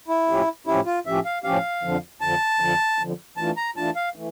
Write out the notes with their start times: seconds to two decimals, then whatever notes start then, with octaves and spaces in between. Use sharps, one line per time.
0.08 E4
0.28 A2 F3 C#4 G4
0.67 A2 F3 C#4 E4 G4
0.86 F4
1.06 A2 F3 C#4 G4 E5
1.25 F5
1.44 A2 F3 C#4 G4 F5
1.83 F2 D3 F3
2.21 F2 D3 F3 A5
2.60 F2 D3 F3
2.99 F2 D3 F3
3.37 E3 A3 D4 F4 A5
3.57 A#5
3.76 E3 A3 D4 F4 A5
3.96 F5
4.15 E3 A3